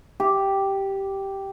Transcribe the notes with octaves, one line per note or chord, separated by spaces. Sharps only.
G4